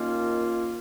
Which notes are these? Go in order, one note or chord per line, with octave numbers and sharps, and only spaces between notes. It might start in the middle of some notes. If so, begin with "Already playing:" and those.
Already playing: D#2 D#3 A#3 C#4 F4